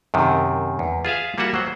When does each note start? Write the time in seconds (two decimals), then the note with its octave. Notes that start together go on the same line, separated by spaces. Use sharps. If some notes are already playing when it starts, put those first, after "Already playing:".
0.14 F#2 C3 D#3
0.79 E2
1.05 F4 G#4 E5 F5
1.38 G3 A#3 F4 F#4 E5 F#5
1.54 F#3 C5